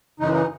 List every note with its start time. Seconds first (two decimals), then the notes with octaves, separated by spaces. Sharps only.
0.20 F#2 C#3 E3 G#3 D#4
0.34 D#4